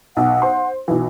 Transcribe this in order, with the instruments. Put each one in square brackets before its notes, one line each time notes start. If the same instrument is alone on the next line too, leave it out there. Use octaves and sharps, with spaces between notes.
[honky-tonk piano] B1 [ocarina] F#5
[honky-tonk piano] C5 C6
[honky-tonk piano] B1 E3 [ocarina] F#4